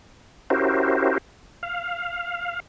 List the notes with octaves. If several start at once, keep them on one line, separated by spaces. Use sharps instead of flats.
C#4 E4 F#4 G4 A#4 C5
F5